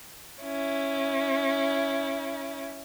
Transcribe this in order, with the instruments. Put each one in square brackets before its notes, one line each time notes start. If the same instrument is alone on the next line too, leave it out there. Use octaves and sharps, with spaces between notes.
[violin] C#4 E4